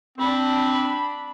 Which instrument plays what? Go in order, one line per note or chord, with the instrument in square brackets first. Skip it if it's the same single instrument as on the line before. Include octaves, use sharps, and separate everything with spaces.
[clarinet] C4 [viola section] D4 B5